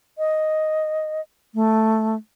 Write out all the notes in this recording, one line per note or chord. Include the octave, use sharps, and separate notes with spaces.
D#5
A3